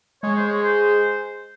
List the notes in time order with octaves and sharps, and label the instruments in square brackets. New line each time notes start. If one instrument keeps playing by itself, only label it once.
[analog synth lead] G#3 [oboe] C#5
[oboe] C5
C#5
C5